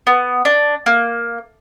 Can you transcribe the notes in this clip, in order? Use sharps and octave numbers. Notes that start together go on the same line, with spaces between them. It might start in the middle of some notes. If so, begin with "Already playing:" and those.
B3
D4
A#3